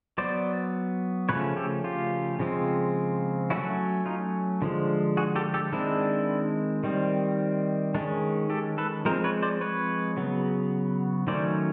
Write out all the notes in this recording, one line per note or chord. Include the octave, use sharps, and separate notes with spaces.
F#3 B3 C5 D5
C#3 F3 A3 C#4 B4 C#5
G4 A4
F4 G4
C#3 F3 G#3 C4
F#3 A3 C#4 E4 F#4
D#4 F4
D3 F3 G#3
F#4 G#4
G4 A4
G4 A4
D#3 G#3 C4 D4 E4
D#3 G3 C4
D#3 G#3 C#4 D4
G4 A4
A4 B4
F3 G#3 C4 A#4 C5
B4 C#5
C5 D5
B4 C#5
C#3 F#3 B3
D#3 F#3 A3 C#4 C5 D5